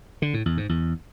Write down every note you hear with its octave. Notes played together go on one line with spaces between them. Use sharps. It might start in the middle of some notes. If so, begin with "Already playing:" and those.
D3
A2
E2
G#2
E2